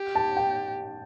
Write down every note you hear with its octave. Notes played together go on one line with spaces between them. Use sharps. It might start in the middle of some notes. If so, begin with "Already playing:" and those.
Already playing: G4
A5
G5